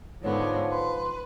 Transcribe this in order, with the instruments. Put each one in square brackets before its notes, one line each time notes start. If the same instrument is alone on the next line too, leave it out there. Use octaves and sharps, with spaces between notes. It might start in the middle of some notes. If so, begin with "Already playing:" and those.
[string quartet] G#2 D3 B3 [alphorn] F3 [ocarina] C#5
[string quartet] B4 [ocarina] C6